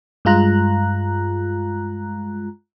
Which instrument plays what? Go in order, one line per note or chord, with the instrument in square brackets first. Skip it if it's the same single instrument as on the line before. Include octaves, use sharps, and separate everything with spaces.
[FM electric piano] G2 G#3 F4 A#5 F#6